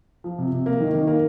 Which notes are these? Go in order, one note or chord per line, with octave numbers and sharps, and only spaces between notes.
F3
C3
C3
A#3
D#3
D#3
A#3